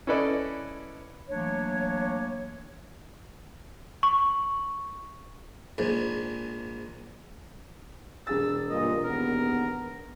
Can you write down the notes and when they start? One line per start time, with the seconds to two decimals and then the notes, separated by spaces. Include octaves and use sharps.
0.07 C#4 E4 A4 B4 D5 D#5
1.29 E3 F#3 A3 A#3 D4 C#5
4.03 C#6
5.78 A#1 G#2
8.27 E1 G#4 E6 A6
8.70 G2 A#2 D#5
9.05 D#2 B3 A#4